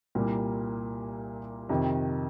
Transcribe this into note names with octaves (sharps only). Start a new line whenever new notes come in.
C2 A#2 G3 A#3
F2 C3 D#3